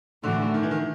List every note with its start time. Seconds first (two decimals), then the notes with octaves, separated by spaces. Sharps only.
0.23 A2 D3 E3 A3 D4 F#4
0.54 D#3
0.63 E3
0.71 D#3